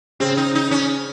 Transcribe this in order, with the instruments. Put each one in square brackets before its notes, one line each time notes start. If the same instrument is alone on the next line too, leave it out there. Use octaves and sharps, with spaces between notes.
[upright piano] C#3 [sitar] C4
[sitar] D#4
D#4
C#4